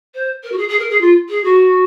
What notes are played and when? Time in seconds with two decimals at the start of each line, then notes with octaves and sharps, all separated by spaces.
0.14 C5
0.43 A#4
0.52 F#4
0.57 G#4
0.68 G#4
0.79 A#4
0.89 G#4
1.00 F4
1.29 G#4
1.44 F#4